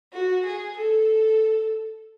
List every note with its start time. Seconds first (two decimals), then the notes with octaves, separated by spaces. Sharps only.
0.13 F#4
0.46 G#4
0.77 A4